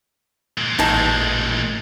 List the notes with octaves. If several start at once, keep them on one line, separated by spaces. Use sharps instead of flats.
A#2 G#3
A1 D#4 A5 G#6